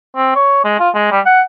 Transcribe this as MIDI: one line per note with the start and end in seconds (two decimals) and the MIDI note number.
0.16 0.33 60
0.35 0.61 73
0.64 0.77 56
0.80 0.89 65
0.94 1.10 56
1.11 1.20 55
1.26 1.42 78